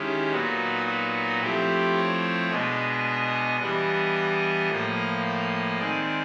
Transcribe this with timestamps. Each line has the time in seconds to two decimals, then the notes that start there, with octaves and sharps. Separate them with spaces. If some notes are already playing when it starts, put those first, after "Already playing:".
Already playing: D#3 G#3 C#4 E4 G4
0.32 A#2 F#3 B3 D#4 F#4
0.87 F#4
1.41 F3 A3 C4 E4 G4
1.97 C#5
2.51 B2 G#3 B3 D4 D#5
3.60 E3 G3 B3 D4 D#5
4.69 A2 F3 A#3
5.79 D#3 G#3 C4 D5